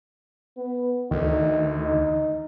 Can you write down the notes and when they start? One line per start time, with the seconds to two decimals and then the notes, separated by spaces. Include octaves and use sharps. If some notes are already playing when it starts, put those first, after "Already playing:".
0.57 B3
1.11 D2 D#3 D#4
1.83 D#4